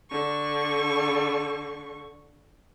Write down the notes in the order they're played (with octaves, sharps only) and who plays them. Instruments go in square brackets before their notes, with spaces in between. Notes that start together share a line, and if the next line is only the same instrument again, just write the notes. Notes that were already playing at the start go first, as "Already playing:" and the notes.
[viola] D3 C#6